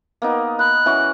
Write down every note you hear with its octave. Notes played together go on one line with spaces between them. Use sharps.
A#3 B3 D#4
B5 F#6
E3 C#4 F#4